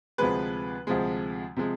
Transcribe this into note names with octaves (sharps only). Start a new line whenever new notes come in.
D2 C3 F3 G#3 B4
D2 C3 F3 G#3
C3 F3 G#3